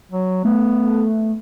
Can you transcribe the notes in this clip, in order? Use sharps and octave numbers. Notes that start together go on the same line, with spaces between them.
F#3
A3 B3